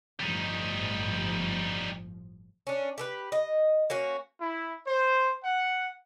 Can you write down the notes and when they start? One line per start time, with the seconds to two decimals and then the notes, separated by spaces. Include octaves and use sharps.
0.20 G1 A2 F3 G3 D#4
2.67 C#4 D4
2.98 G4 A4 B4
3.32 D#5
3.90 A#3 C#4 F#4
4.41 E4
4.87 C5
5.44 F#5